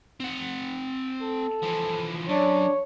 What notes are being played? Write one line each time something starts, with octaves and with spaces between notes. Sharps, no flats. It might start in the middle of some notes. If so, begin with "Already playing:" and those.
C4 F#5
A4
E3 F3
F#2 D4 C#5